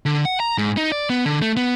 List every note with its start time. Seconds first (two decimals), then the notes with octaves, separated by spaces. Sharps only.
0.05 D3
0.25 F#5
0.40 A#5
0.58 G#2
0.77 D#4
0.92 D5
1.10 B3
1.26 D3
1.42 A3
1.57 B3